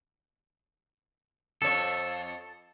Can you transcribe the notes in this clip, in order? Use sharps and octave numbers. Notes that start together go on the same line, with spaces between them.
F2 A4 C#5